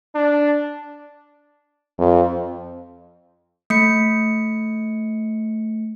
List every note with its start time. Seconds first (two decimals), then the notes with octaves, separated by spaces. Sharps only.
0.15 D4
1.98 F2
3.70 A3 C#7